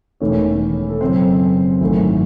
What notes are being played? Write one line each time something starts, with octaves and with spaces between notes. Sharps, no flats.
E1 E2 D#3 A3 C#4 C#5
A4
F#2 C#3 E3 C4 C5
G#1 F#2 E3 A3